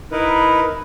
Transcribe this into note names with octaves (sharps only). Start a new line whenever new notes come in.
D#4 E4 A#4 B4